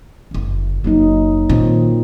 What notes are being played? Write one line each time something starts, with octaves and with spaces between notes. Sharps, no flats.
F#1 D3
F#1 F#3 A#3 D#4
A#2 D#3 C4